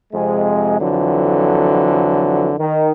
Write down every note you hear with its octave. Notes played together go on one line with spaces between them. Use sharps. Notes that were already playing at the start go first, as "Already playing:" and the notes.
F2 C3 G#3
F2 D3 E3 F#3
D#3